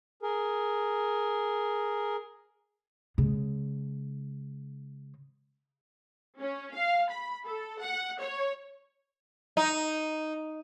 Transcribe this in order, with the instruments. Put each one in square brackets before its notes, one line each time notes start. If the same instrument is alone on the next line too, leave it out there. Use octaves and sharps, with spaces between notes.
[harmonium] G#4 A#4
[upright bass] C#3 G#3
[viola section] C#4
F5
B5
A4
F#5
C#5
[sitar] D#4